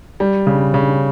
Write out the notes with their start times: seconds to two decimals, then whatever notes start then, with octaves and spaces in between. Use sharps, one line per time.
0.20 G3
0.47 C#3
0.74 C#3